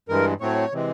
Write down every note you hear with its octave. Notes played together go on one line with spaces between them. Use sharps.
G2 E3 G#3 A#4
A2 F#3 A3 C4 C#5
C3 E3 G#3 C4